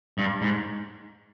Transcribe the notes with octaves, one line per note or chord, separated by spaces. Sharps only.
G2
G#2